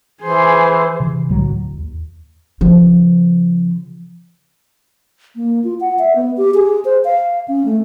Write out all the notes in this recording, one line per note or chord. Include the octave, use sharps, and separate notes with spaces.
E3 G#4 C5
C3 E3
C2 A2 D3 F#3
D1
D#2
C#3 F3
A#3
F4
F#5
E5
B3
G4
G#4
C5
F5
C#4
A3